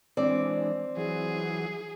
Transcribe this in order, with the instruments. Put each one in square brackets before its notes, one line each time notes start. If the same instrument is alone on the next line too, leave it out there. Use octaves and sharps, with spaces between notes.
[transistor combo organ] E3 G#3 D4 [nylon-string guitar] C4 D5
[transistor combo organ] E3 F#3 [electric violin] G#4